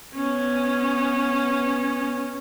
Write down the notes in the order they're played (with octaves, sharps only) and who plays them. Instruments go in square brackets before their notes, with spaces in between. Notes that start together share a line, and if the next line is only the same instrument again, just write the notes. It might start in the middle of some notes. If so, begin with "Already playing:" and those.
[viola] B3 C#4